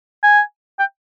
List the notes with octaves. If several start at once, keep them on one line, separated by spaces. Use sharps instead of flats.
G#5
G5